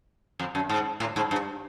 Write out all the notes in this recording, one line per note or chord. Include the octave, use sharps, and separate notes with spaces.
F2
F#2
G#2
A2
G#2
G2